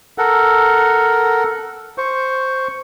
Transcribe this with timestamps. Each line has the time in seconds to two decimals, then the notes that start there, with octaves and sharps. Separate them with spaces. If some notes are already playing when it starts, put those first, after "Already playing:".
0.18 A4 A#4 F#5
1.98 C5 C#6